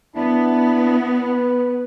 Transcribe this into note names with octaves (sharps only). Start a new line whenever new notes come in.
B3 D4 E4
B4